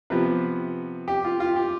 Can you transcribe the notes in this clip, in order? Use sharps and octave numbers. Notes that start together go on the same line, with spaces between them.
C3 F3 B3 B4
G4
F4
F4
G4